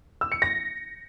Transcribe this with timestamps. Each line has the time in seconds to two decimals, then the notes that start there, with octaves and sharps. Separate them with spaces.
0.21 E6
0.32 C#7
0.42 A#6